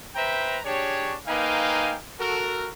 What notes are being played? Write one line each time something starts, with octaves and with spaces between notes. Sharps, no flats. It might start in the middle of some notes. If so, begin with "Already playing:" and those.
B4 C5 E5 G5 A#5
D4 G4 G#4 C#5
A#3 D#4 B4 F5 G5 G#5
F#4 A4 A#4